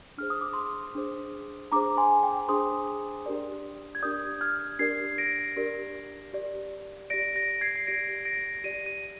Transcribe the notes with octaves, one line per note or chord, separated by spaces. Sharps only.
D4 G#4 C5 F6
D#6
D6
C6 D#6
D4 G#4 C5
D4 G#4 C5 A#5 D6
G#5 C6
G5
D4 G#4 C5 C6 D#6
D4 G4 A#4 D5
G#6
D4 G4 A#4 D5 D#6 G6
F6 G#6
D4 G4 A#4 D5 G#6 C7
A#6 D7
D4 G4 A#4 D5
G4 D5
G4 D5 A#6 D7
A#6 D7
G#6 C7
C7
G4 D5 A#6 D7
A#6 D7
G4 D5 D#7
D#7